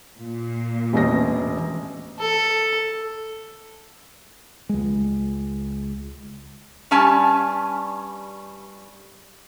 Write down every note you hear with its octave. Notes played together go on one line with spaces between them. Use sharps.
A#2
E1 A1 A#6
A4
C#2 G#3
G2 G3 C#4 G#5 A5